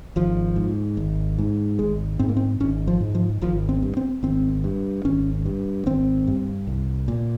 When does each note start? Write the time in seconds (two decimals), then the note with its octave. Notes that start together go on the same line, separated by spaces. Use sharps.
0.16 G#1 F3
0.56 G#2
0.97 G#1
1.38 G#2
1.79 G#1 G#3
2.19 G#2 C4
2.29 A#3
2.37 C4
2.60 G#1 C#4
2.88 F3
3.01 G#2
3.15 F3
3.41 G#1 F3
3.69 C4
3.82 G2
3.97 C4
4.23 G#1 C4
4.64 G2
5.05 G#1 C#4
5.45 G2
5.86 G#1 C4
6.27 G2
6.67 C2
7.08 A#2